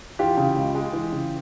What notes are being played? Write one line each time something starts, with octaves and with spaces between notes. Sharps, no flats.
E3 F4 G4
C#3
C#2
G#3
E3
C#3